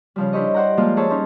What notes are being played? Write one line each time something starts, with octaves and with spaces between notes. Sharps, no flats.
C#3 F3 G3
D4 E4 G4 C5 C#5 D#5
C5 D5 F#5 G5 A#5
F3 G3 G#3 A#3 F4
G#4 C5 C#5 E5 A5
C#4 D#4 C5